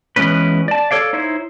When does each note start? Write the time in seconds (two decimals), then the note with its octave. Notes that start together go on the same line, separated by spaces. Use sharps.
0.16 E3 G#3 B3 C#4 B4
0.68 D5 A5
0.91 A4 C#5 D5 F5
1.13 D#4 E4 C5 C#5